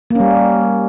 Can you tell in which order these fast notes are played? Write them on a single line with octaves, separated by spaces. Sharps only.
A#3 C#4 G3